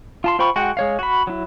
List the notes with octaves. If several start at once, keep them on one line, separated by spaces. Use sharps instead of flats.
F4 A5 C6
F4 C5 G5 B5 C#6
G#3 F#4 F#5 G5
G#3 C#5 F5
F#4 B5
F#3 E4